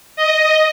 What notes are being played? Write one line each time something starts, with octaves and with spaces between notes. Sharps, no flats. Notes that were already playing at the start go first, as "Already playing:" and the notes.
D#5